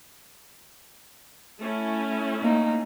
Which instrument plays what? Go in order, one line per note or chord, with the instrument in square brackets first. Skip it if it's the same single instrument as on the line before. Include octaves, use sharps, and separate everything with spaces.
[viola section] A3 C#4 E4
[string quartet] A#3 D#4